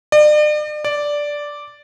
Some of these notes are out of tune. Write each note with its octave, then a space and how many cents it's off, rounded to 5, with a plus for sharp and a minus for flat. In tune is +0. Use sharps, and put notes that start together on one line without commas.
D5 +40
D5 -5